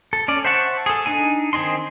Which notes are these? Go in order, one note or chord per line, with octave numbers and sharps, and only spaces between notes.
A4
C#4 D5
C5 E5 F#5 A5 C#6
G#4 A4
D4 D#4 G#5
D#3 C4 G#4 D#5 C6